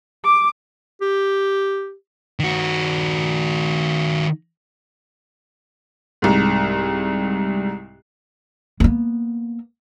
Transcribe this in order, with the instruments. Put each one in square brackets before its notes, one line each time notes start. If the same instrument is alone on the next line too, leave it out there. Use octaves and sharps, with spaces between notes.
[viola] D6
[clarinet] G4
[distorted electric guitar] D#3 F#4
[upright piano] C2 G#2
[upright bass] A#3 B3